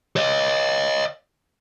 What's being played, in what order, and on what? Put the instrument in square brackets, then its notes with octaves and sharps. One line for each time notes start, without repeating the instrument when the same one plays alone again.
[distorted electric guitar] C#5 D#5